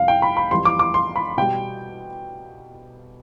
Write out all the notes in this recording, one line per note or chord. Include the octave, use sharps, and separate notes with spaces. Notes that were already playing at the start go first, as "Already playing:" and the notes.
Already playing: F2 C3 G3 F5
G5
B5
B5
F2 E3 G3 C6
D6
D6
C6
B5
B2 G3 G5